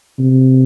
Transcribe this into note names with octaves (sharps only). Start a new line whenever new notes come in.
C3